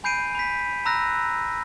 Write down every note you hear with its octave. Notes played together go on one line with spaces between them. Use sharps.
G#5 B5 G6 C7 D7 D#7
B5 B6
A#5 B5 E6 F#6 A#6